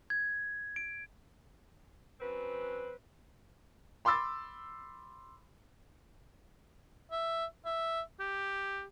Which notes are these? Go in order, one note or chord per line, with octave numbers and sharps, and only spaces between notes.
G#6
D7
F#2 C4 B4
B5 C6 D6 E6 A6
E5
E5
G4